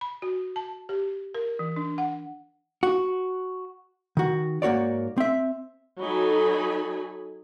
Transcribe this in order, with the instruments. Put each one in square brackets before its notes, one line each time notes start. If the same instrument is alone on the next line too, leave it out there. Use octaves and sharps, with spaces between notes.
[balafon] B5
F#4
A5
G4
A#4
E3
D4
F#5
[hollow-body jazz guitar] F#4
D#3 F#4
G#2 A#3 F#4 C#5 D5
C4 E5
[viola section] F#3 D#4 A4 G#5 B5